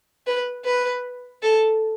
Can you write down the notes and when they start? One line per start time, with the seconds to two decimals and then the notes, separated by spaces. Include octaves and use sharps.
0.27 B4
0.65 B4
1.42 A4